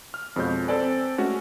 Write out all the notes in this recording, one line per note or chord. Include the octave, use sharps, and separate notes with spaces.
F6
F2 B2 F3 G#3 C#5 G6
C4 A4 B4 D5 G#5
G#3 A3 C#4 F#4